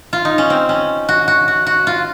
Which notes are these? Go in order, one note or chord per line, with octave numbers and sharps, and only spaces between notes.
F4
D#4
C#4
C4
C#4
F#4
F#4
F#4
F#4
F4